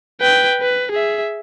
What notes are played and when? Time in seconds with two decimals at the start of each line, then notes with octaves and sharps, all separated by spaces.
0.21 B4 G5
0.62 B4
0.92 G#4 E5